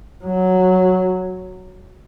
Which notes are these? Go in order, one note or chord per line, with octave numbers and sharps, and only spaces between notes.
F#3